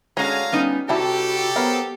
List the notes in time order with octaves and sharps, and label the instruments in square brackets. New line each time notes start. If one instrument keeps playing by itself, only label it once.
[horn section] D3 F5 A#5 [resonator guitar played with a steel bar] G#3 C#4 [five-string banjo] F#4 C#5
[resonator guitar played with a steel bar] G3 B3 D#4 [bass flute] C#4
[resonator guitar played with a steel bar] C3 [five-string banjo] G3 E4 A5 [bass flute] F#4 [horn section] G4 A4
[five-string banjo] F#3 A#4 B5 [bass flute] B3 [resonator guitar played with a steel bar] C5